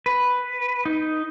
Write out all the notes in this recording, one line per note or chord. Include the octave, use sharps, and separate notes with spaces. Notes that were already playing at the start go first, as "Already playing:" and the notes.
B4
D#4